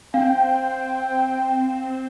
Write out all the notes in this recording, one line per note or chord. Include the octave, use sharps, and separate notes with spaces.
C4 F5 G5